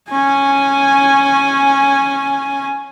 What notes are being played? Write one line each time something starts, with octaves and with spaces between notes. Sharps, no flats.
C#4 G#5